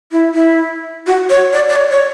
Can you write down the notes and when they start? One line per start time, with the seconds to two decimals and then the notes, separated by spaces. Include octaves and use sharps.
0.12 E4
0.34 E4
1.07 F#4
1.29 C#5
1.53 D5
1.69 D5
1.76 C#5
1.91 C#5